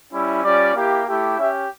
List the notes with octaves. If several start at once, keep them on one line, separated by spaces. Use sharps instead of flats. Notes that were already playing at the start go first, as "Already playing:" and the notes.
G3 C#4 E4
G3 C#4 F4 D5
A#3 E4 G4
A3 E4 G4
C#4 G4 E5